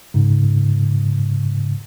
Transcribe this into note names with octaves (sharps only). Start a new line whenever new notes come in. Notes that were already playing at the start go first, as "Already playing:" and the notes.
G#2 C#3